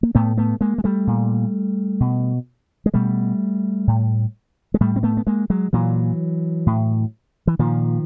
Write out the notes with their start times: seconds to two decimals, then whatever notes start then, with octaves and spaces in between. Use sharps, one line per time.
0.03 A#3
0.15 A2 A3 B3
0.37 A3 B3
0.61 G#3 A#3
0.78 G#3
0.84 G3 A3
1.07 A#2
2.00 B2
2.86 G#3
2.94 B2 G3 A3
3.87 A2
4.74 G#3
4.81 A2 G3 A3
4.96 C4
5.03 A3 B3
5.17 B3
5.27 G#3 A#3
5.50 F#3 G#3
5.73 A#2 E3 F#3
6.67 A2
7.47 E3
7.59 A#2 D#3 F3